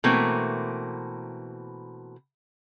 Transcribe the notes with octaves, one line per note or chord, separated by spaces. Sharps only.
B2 E3 A3 A#3 C4